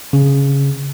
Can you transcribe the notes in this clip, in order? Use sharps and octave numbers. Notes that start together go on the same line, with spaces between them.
C#3